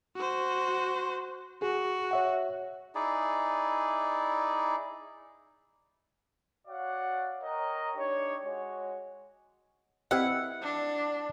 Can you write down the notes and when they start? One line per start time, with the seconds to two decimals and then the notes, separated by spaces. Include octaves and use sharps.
0.16 F#4 C5
1.62 F#4 G#4
2.11 C#5 E5 F#5
2.95 D#4 E4 G#4 D5
6.67 F#4 C#5 D5 F5 F#5
7.43 A#4 C#5 D#5 G5 A#5
7.96 D4 D#4 G4 C#5
8.44 G#3 F#4 C#5
10.11 C4 E4 G4 B4 D#5 F5 F#5
10.62 D4